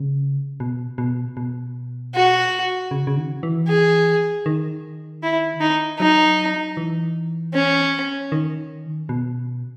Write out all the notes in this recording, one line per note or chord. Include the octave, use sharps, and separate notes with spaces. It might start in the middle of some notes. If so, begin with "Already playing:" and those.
Already playing: C#3
B2
B2
B2
F#4
C#3
C#3
D#3
E3
G#4
D#3
E4
D#4
F#3 D#4
E3
C#4
D#3
B2